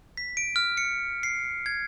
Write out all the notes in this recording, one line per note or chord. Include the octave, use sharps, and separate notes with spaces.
B6
D7
F6
C#7
C7
G#6